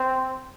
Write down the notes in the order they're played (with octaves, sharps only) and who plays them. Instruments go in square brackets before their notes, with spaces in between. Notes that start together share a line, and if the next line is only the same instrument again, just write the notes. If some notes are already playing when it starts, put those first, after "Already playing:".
Already playing: [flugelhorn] C4